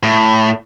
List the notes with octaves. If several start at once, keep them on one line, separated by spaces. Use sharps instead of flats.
A2